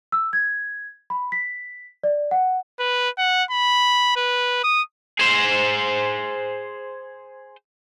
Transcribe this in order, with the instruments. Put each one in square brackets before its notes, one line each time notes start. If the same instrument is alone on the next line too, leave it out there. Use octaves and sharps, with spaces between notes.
[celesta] E6
G#6
B5
B6
D5
F#5
[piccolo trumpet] B4
F#5
B5
B4
D#6
[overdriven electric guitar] G#4 C5